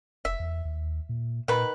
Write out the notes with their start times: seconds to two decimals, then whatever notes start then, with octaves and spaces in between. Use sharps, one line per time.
0.25 F1 E5
0.40 E2
0.65 D#2
1.09 A#2
1.48 A#2 D#3 B4